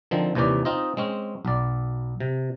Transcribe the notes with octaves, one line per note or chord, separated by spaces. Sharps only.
D3 D#3 F3 C4
D#2 C3 E3 C#4 D5
C4 D#4 F4 D#5
G#3 C4 C#4
B1 D5
C3